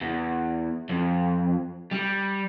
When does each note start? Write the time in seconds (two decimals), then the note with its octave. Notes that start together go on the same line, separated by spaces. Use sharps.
0.01 E2
0.90 F2
1.91 G3